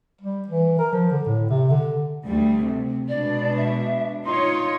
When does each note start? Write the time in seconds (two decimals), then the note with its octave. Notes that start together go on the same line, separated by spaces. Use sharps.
0.21 G3
0.48 E3
0.79 A#4
0.93 F3
1.11 D3
1.26 A2
1.50 C3
1.70 D3
2.26 D2 G3 A3
2.66 C3
3.09 B2 G#3 D4 D5
3.57 E5
4.26 D#4 F4 C#5 C6